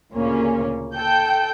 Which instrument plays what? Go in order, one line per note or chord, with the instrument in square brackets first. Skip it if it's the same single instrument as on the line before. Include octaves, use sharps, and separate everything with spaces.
[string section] D2 A#2 C#3 A#3 C#4
A4 G5 G6